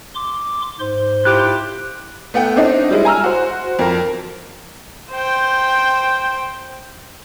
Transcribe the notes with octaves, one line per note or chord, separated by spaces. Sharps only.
C6 D6
G#2 C5 C6
E4 F4 G4 F#6
A3 B3 F#5 G5
C4 D4 D#4
G3 G#3 E4
G#5 A#5 E6 F6
F#4 C5
F2 A#4
C5 G5